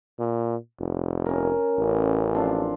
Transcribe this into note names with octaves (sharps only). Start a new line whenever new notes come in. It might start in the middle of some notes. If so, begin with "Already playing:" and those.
A#2
F1
C#4 A#4
A1
F3 C4 D4